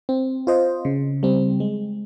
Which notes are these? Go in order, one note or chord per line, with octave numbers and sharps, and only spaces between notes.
C4
F4 C5 D#5
C#3
G3 C4
G#3